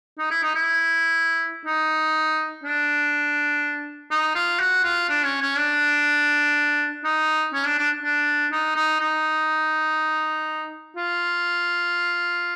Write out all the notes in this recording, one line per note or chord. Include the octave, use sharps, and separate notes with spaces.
D#4
E4
D#4
E4
D#4
D4
D#4
F4
F#4
F4
D4
C#4
C#4
D4
D#4
C#4
D4
D4
D4
D#4
D#4
D#4
F4